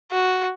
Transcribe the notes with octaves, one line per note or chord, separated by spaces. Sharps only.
F#4